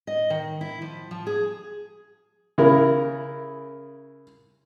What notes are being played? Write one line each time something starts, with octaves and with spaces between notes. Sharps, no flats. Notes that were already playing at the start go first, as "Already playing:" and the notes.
D#5
D#3
E4
F3
F3
G#4
C#3 E4 A#4